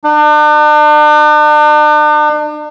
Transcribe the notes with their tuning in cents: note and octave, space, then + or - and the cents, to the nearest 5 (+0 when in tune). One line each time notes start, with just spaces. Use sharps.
D4 +40